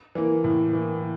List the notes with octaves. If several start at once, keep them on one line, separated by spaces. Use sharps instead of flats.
E3 A#3
A2
E3 A#3